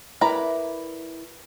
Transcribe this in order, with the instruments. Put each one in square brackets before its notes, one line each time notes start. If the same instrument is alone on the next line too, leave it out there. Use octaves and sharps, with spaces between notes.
[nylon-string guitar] E4 A#4 D5 [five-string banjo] B4 A#5 B5